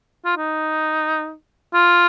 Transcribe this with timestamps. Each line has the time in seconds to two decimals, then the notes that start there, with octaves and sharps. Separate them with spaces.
0.25 F4
0.37 D#4
1.74 F4